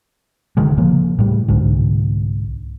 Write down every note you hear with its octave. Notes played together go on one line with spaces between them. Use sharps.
D1 D3 D#3 G#3
C#3 F3 A#3
A2 G3
C2 G#2 D3